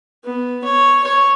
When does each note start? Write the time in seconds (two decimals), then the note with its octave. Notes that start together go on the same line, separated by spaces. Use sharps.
0.24 B3
0.64 C#5
1.03 C#5